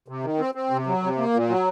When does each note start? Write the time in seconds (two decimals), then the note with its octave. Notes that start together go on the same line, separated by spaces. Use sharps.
0.08 C3
0.24 D#3
0.39 C4
0.55 C4
0.71 C3
0.87 F#3
1.03 C3
1.18 A#3
1.34 A#2
1.49 F#3